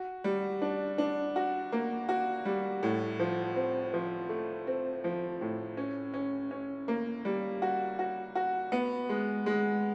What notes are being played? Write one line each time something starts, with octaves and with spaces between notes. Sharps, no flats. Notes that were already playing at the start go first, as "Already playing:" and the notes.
Already playing: F#4
G3
D4
D4
F#4
A#3
F#4
G3
A2
F3
C4
F3
A3
C4
F3
A2
C#4
C#4
C#4
A#3
G3
F#4
F#4
F#4
B3
G#3
G#3